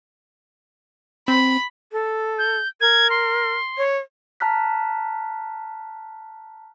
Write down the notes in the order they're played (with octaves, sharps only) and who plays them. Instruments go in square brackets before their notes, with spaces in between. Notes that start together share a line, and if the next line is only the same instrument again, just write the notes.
[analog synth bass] C4 [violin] B5
[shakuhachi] A4
[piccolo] G6
[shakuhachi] A#4 [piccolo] G#6
[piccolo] C6
[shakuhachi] C#5
[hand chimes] A5 A#5 F6 F#6 B6